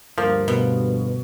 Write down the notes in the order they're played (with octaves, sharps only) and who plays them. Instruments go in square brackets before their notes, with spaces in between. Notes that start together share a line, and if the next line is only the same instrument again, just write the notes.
[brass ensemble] D2 G2 [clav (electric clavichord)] F3 [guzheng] A#3
[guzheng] B2